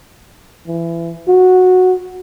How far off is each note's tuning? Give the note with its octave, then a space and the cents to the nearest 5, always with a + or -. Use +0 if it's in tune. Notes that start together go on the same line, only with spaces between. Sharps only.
E3 +25
F#4 -10